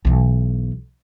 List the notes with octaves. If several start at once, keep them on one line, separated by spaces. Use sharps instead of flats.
B1 E3